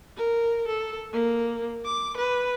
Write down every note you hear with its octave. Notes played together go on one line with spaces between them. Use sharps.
A#4
A4
A#3
D6
B4